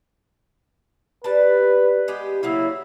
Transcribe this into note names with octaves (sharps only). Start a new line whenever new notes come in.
G3 B4 A5
G#3 B3 G4
C#3 F#3 A#3 E4